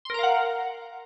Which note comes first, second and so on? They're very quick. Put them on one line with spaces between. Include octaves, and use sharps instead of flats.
C6 A#4 A#5 F5 F#5